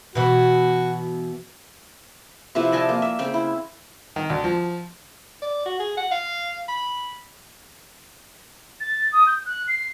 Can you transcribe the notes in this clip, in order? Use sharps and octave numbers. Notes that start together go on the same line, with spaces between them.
B2 E3 F#4
C3 F3 E4 B4
D5 D#5 G#5 A5
A#3
E5
C#3 C4 G5
E4
D#3
D2
F3
D5
F#4
G#4
F#5
F5
B5
A6
D#6
G6
F#6
C7